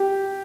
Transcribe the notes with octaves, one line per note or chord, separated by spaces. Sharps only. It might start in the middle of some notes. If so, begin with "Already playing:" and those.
Already playing: G4